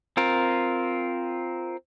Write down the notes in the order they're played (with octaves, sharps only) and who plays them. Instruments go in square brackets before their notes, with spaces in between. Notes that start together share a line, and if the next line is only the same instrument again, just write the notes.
[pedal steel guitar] C4 F4 A#4